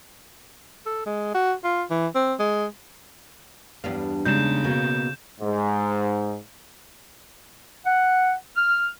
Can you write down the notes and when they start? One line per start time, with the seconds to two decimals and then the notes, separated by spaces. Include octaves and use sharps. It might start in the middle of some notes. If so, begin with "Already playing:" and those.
0.86 A4
1.06 G#3
1.34 F#4
1.64 F4
1.90 E3
2.15 C4
2.39 G#3
3.84 E2 G2 B3 D4 F5
4.25 C#3 G3 G#3 B3 D#4 G6 E7
4.64 B2 A#3
5.41 G#2
7.85 F#5
8.56 F6